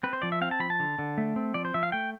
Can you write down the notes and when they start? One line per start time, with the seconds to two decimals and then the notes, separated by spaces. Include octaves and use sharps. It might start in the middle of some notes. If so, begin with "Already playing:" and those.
0.03 C4 B4
0.13 C5
0.22 F3 D5
0.32 E5
0.41 C4 F5
0.51 A5
0.60 F3 B5
0.70 A5
0.80 D3
0.99 D3
1.18 A3
1.36 C4
1.54 F3 D5
1.65 C5
1.74 F3 E5
1.83 F5
1.92 A3 G5